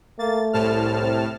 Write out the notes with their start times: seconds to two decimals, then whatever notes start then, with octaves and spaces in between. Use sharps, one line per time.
0.19 A3 A#3 A6
0.53 C2 A2 A5 F6
1.01 C3